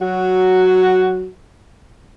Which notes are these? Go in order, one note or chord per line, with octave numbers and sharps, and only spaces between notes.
F#3 F#4